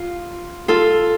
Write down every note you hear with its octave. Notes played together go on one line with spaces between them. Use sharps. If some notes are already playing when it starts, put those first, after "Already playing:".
Already playing: F4
F4 A4